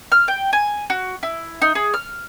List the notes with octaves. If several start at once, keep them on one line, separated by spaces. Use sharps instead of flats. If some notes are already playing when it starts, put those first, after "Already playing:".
F6
G5
G#5
F#4
E4
D#4
G#4
F6